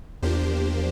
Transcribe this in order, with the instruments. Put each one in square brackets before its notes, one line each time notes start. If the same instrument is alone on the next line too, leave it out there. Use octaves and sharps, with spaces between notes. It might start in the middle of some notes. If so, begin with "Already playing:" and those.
[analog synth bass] E2 [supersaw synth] F3 A#3 D4 G4 C5